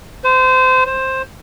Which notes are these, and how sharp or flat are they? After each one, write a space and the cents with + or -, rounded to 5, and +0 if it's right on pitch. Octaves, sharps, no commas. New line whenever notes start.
C5 -25
C5 +10